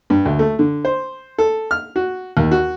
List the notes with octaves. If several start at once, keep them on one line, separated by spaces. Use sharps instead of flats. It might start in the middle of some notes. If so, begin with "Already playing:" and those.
G2
D2
A3
D3
C5
A4
F6
F#4
D#2
F#4